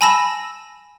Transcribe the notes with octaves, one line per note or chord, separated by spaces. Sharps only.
G#5 A5 B5 E6 A#6 E7